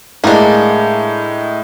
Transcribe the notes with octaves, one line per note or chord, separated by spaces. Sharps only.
A2 G#3 A#3 D4